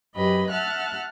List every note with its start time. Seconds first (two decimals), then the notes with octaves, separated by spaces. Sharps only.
0.15 F#2 G4 B4 D#5 B5
0.51 E5 F#5 A5 F6 F#6